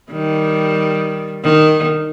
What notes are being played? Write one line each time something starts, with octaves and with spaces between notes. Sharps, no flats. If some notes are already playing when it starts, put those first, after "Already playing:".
D#3 G3
D#3